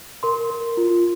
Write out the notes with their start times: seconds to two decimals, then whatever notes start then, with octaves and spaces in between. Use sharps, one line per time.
0.23 A#4 C6
0.50 A#4
0.77 F4